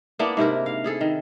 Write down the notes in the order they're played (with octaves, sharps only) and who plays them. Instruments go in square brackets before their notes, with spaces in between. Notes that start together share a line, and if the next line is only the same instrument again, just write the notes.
[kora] A#3 B3 D4 E4
G#2 C3 E4 A#4
F5
E4 G#4 A4
D#3